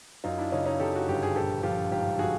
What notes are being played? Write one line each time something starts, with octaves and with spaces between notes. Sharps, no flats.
F#2 D#4 F4
D4 E4
C#3 C#4 D#4
C#4 D#4
C#3 G4 A4
F#4
G1 G4
G#4
A#1 G4 A4
F3 F4 G4
G#2 F4 G4
F3 F#4 G#4